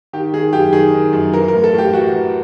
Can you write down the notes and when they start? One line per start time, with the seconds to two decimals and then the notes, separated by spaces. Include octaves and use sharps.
0.13 D#3 G4
0.33 D#3 G#4
0.53 F#2 G4
0.73 D#3 G#4
0.94 D#3
1.13 F#2
1.33 E3 A#4
1.48 A#4
1.54 A2
1.64 A4
1.74 A2 G4
1.93 E3 F#4
2.14 E3